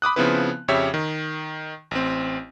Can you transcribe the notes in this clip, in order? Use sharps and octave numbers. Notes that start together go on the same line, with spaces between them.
B5 D6 D#6 F#6
C#3 F3 B3 C4 E4 B4
F2 C#3 G4 C#5 E5
D#3
A1 C4